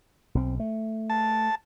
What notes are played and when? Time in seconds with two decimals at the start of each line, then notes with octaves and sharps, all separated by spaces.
0.35 B1 C4
0.60 A3
1.10 A5